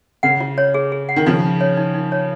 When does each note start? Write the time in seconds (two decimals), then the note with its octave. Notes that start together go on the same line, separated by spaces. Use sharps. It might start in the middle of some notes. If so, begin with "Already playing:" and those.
0.23 C#3 F#5
0.41 F4
0.58 C#5
0.74 G#4
0.92 G#4
1.09 F#5
1.16 D#3
1.26 C#3 F3 D#4
1.43 D#4
1.61 C#5
1.77 D#4
1.94 D#4
2.12 C#5